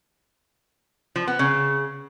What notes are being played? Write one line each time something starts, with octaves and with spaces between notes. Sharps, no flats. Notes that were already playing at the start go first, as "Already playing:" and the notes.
F3
B3
C#3